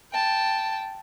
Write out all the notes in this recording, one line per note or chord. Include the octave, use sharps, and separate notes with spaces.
G5 A5